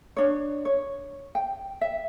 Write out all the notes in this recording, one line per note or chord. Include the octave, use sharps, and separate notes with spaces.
D4 C#5
C#5
G5
E5